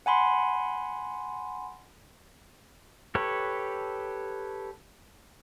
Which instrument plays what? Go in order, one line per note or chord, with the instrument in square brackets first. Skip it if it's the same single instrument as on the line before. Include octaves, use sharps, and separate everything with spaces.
[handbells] F#5 G#5 B5 C6
[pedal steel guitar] G4 A4 B4 C#5